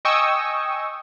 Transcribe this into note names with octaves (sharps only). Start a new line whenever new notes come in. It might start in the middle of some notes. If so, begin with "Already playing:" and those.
D#5 G5 G#5 C#6 D#6 E6